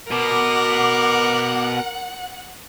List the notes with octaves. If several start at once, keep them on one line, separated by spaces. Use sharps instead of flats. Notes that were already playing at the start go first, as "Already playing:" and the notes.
B2 A#4 F#5 D6